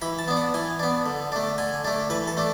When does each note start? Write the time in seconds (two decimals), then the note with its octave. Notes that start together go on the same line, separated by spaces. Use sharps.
0.02 E3 B5
0.19 A5
0.28 B3 D4
0.37 F#5
0.54 E3 G#5
0.79 B3 D4
1.06 D3
1.32 A3 D4
1.58 D3 G#5
1.85 A3 D4
2.10 E3 B4
2.27 A4
2.37 A3 D4